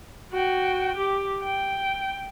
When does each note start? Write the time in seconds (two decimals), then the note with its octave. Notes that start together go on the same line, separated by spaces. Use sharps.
0.33 F#4 G5
0.98 G4
1.44 G5